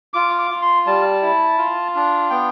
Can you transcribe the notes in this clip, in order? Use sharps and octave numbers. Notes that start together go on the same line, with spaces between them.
F4 D6
D6
F4
C6
G3 A5
E4
F4
D4
B3 G5